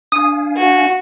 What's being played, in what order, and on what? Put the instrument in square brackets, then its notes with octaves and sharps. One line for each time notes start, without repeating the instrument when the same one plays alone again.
[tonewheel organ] D4 F5 G#5 [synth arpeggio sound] D#6
[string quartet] F#4